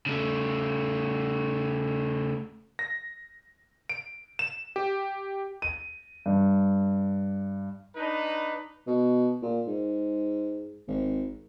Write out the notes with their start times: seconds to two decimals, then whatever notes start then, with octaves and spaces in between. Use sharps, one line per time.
0.06 C#3 A3
2.79 A#6
3.89 D7
4.39 E7
4.76 G4
5.62 D#7
6.26 G2
7.95 D4 D#4 B4 A#5
8.87 B2
9.42 A#2
9.67 G#2
10.88 G#1